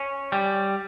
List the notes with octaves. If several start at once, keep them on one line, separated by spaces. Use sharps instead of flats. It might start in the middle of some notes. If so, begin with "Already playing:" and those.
Already playing: C#4
G3